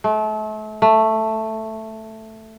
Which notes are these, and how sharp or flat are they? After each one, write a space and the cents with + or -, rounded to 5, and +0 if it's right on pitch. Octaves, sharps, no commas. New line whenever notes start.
A3 -35
A3 +5